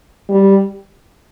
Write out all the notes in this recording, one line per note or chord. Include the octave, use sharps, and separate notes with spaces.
G3